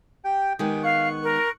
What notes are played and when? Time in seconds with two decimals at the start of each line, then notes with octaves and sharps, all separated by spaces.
0.25 G4 G5
0.59 D#3 G#3 B3 G4 G#4 G5
0.83 F5 C#6 F#6
1.23 A#4